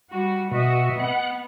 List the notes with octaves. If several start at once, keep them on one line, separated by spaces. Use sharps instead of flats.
G3 F#4
B2 F#4 D#5 E5
B3 F#5